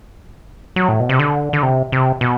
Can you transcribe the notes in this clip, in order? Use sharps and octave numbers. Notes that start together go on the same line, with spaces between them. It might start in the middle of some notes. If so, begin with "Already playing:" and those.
F#3
A2
B2
C3
D3
D3
C3
C3
B2